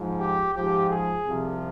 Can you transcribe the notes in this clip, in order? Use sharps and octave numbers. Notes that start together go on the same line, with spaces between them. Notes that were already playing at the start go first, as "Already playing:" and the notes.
Already playing: G#2 F3
G4
G#2 F3 G4
G#4
C2 C3 F3